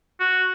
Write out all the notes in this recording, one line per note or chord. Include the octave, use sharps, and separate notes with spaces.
F#4